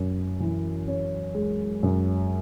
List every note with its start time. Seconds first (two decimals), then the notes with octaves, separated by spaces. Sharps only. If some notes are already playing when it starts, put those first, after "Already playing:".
Already playing: F#2 C#4
0.40 E3
0.88 C#4
1.35 G#3
1.83 F#2